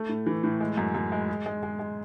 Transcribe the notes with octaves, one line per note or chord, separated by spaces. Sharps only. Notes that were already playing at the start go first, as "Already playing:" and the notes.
Already playing: A3
A2
E3
A2
G#3
F#2
F#2
G#3
G#4
G#3
G#3
G#3